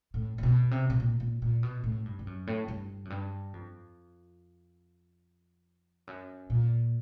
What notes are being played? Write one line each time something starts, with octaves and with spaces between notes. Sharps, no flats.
A2
A#2
B2
C3
B2
A#2
A#2
A#2
B2
A2
G2
G2
F#2
A2
G2
F#2
G2
F2
F#2
A#2